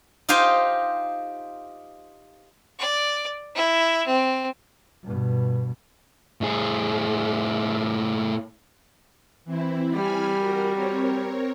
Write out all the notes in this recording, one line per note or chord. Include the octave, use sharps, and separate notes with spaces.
D#4 F4 G4 C5 F5 G#5
D5
E4
C4
G2 B2
A2 G#4
E3 C4 E4
G3 G#5 B5 F6
F#4 A#4
C4 A#4 C#5